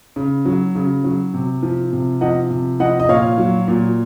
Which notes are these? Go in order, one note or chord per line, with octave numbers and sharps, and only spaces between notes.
C#3
F#3
C#3
F#3
C3
F3
C3
F3 D#5 F#5
C3
F3 D#5 F#5
D#5
A#2 C#5 F5
F#3
A#2